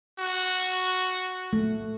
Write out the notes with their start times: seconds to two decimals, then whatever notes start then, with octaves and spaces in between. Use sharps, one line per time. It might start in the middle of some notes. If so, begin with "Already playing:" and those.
0.19 F#4
1.53 A3